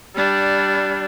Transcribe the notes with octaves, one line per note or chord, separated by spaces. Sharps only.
G3 D4